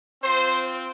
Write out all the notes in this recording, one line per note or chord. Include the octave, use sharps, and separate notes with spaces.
C4 F4 C5